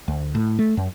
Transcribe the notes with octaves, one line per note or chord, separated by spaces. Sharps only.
D2
A2
A3
F#2